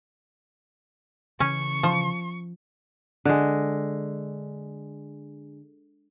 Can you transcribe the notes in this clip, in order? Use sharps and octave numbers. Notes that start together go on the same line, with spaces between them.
C#3 E3 C#4 C#6
F3
D3 G#3